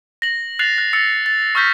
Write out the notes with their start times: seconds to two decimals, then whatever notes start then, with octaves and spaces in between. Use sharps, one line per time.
0.22 A#6 F#7
0.59 F#6 A6 C7 F7 F#7
0.78 F#6
0.93 E6 A6 A#6 C#7
1.26 A6
1.55 C#6 E6 F6 G6 A#6 B6